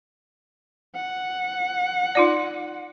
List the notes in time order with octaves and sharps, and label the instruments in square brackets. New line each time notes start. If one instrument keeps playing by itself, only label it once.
[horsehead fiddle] F#5
[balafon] D#4 F4 D5